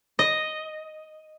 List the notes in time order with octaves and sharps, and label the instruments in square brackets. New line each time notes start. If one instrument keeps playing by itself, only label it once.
[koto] D#5